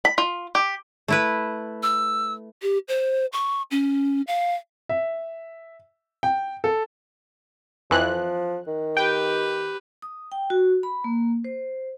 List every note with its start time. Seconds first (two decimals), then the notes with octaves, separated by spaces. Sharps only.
0.05 B5
0.18 F4
0.55 G4
1.08 A3 E4 B4
1.83 E6
2.62 G4
2.88 C5
3.33 C#6
3.71 C#4
4.27 F5
4.89 E5
6.23 G5
6.64 A4
7.91 F2 E3 F3 F#6
8.67 D#3
8.97 G4 B4 G5
10.02 D#6
10.32 G5
10.50 F#4
10.83 B5
11.04 A#3
11.44 C5